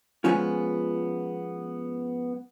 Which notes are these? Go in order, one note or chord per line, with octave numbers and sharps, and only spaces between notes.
F3 G#3 B3 C#4 F4